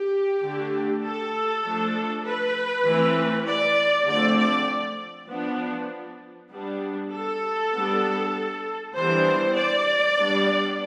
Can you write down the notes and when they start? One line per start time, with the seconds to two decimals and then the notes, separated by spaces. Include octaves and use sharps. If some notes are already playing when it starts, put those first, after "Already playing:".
Already playing: G4
0.42 D3 A3 D4
1.04 A4
1.64 F3 A3 D4
2.25 B4
2.86 E3 A3 C4
3.47 D5
4.08 D3 F3 A3 C4 D5
4.38 D5
5.30 F3 B3 D4
6.51 G3 B3 D4
7.12 A4
7.74 G3 B3 D4
8.96 E3 G3 B3 D4 C5
9.56 D5
10.17 G3 B3 D4